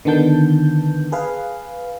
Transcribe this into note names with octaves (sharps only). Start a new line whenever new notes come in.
D3 D#3 B3 A5 G6
G#4 B4 F5